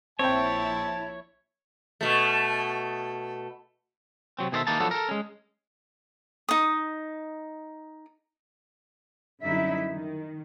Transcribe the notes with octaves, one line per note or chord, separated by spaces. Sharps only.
A#1 C4 E4 C#5 G5 A5
B2 A3
C3 F#3 C4
B2 D#3 G#4 A4 C5 E5
D#2 E3 A#3 D#4 A5
F3 F#3 A3 B3 D4 A4
A4 A#4
G#3 C#4
D#4 D#6
F#2 D3 G3 D#4 E4 E5
D#3